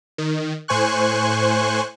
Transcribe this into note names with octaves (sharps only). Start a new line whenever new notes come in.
D#3
A2 C5 G#5 C#6 F#6